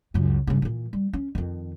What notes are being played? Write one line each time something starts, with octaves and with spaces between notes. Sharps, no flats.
C#2 F#2
G2 C#3
A#2 E3
G3
C#4
F2 D#3